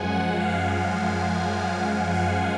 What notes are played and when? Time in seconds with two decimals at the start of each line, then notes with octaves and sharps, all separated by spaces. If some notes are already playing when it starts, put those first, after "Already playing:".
Already playing: F#2 F3 G#3 F#5 G#5
0.13 F#5
0.41 F5
2.14 F#5